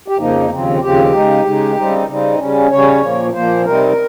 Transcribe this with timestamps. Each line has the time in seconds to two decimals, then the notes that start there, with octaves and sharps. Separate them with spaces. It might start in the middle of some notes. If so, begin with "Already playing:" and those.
0.08 G4
0.18 F2 C#3 F3 A#3 D#4
0.50 D#2 C#3 F3 C4
0.81 D#2 C#3 F3 C4 G4
1.13 C#3 G#3 D#4
1.45 C#3 G#3 D#4
1.76 C#3 G3 C4 D#4
2.07 C#3 G3 C4 D#4
2.38 C#3 G3 C#4
2.70 C#3 G3 C#4 C#5
3.01 A#2 F3 A#3
3.33 A#2 F3 A#3 C5
3.64 C3 G3 C4 D#4 A#4